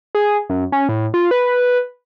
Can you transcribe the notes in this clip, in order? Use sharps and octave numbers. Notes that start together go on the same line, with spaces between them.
G#4
F#2
C#4
A2
F4
B4